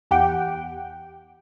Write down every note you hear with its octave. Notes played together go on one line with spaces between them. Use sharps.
E2 G4 F#5 G5